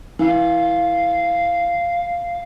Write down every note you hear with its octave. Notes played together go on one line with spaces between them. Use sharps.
E3 F5